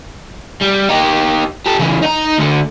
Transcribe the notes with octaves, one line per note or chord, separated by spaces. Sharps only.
G3
D#4 G4
G4 A4
C#3 E3
D#4 A#5
D2 D3